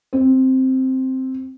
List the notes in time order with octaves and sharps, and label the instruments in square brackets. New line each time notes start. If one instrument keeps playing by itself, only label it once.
[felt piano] C4